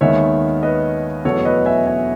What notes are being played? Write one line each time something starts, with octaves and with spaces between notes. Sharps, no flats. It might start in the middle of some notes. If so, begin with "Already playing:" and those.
D#2 D#3 G#3 B3 C#5 E5
B4 D#5
E2 B2 F#3 A3 A4 C#5
B4 D#5
E5 G#5
E5 G#5